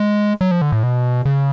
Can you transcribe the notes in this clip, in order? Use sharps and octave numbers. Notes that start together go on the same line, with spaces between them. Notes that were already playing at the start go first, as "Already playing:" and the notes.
Already playing: G#3
F#3
F3
D3
A2
B2
C#3